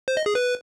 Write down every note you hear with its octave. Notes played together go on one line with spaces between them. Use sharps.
C5
D#5
G#4
B4